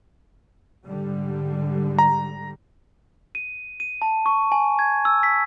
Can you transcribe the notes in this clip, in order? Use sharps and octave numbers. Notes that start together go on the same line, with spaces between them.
G#2 D3 G3
A#5
D#7
D#7
A5
C#6
G#5
G#6
E6
B6